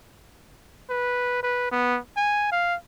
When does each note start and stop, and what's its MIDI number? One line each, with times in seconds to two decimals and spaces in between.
0.90 1.41 71
1.43 1.67 71
1.71 1.99 59
2.17 2.50 80
2.52 2.75 77